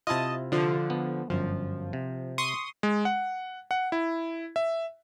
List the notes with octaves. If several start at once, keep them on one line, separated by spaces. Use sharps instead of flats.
C3 E4 F4 D#5 A5
D3 F3
B3
G1 F#2 F3
C3
C6 C#6 D#6
G#3
F#5
F#5
E4
E5